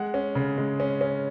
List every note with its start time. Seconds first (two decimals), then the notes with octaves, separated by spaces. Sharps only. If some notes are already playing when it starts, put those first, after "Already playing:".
Already playing: G#3 F#5
0.14 C#4
0.35 C#3
0.58 G#3
0.80 C#4
1.01 C#4